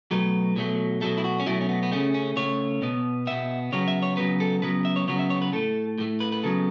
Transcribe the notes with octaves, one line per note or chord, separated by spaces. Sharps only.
B2 F#3 A3 B4
B2 F#3 A3
B2 F#3 A3 A4
E4
F#4
C#4
B2 F#3 A3 E4
C#4
B3
B3
C#3 A3 C#4
C#4
C#3 A3 C#5
B2 B3
B2 B3 E5
C#3 F#3 B3 C#5
E5
C#5
C#3 F#3 B3 B4
A4
C#3 F#3 B3 B4
E5
C#5
C#3 F#3 B3 C#5
E5
C#5
B4
A2 A3 A4
A2 A3
B4
B4
C#3 F#3 B3 A4